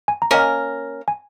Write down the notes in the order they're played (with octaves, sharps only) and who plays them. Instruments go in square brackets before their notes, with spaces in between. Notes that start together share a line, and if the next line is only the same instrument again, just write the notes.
[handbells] G#5
A#5
[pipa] A#3 C#4 A#4 [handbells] D#5 G#5
[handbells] G#5